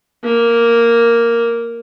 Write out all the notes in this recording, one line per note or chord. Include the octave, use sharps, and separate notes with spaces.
A#3